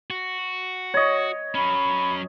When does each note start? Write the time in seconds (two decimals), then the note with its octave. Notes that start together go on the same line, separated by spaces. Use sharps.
0.10 F#4
0.94 C#5 D#5
1.55 F#3 C#4 B5